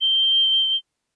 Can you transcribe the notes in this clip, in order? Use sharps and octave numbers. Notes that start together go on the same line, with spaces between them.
G7